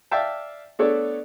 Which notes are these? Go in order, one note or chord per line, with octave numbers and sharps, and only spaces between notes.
D5 E5 F5 G5 A5
A3 B3 D4 A4 C#5 D5